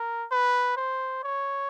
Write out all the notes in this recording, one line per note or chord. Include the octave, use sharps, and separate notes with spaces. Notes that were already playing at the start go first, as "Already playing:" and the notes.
Already playing: A#4
B4
C5
C#5